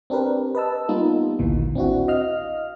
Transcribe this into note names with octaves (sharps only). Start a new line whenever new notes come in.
C4 D4 G4 A#4 B4
B4 D#5 A5 E6
G3 A#3 B3 D#4 F4
A1 D2 A#2 D#3 E3
C4 D4 E4 F#4
D#5 F5 F6